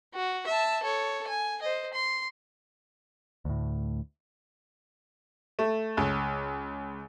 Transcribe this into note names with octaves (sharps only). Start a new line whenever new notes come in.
F#4
E5 A5
A4 C#5
G#5
C5 D#5
C6
D2 A2
A3
C#2